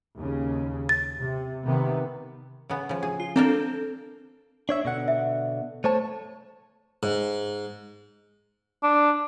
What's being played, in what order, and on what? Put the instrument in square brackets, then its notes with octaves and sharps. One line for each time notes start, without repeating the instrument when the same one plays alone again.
[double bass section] D#2 C#3
[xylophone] A6
[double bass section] C3
C3 D#3 B3
[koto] C#3 B3
C#3 F3
G#4
[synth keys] F4
[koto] A#3 D4 A#4 [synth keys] C4 A4
[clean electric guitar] D4 C#5 E5
B2 D3 F#5
[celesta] E5
[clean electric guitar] A3 C#5 A5 [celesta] C5
[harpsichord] G#2
[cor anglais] D4